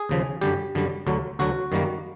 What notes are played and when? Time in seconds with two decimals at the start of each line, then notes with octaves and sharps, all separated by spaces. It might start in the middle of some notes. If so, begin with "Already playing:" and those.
Already playing: G#4
0.09 D#2 C#3 F3
0.41 F#2 D3 G3 G4
0.75 F#2 D3 G3
1.07 D2 D3 F#3
1.39 D2 D3 F#3 F#4
1.72 F#2 D#3 G3 A#3